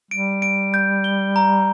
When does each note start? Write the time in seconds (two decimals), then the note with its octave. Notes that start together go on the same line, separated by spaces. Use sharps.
0.11 G3 D7
0.42 D7
0.74 G6
1.04 G7
1.36 A#5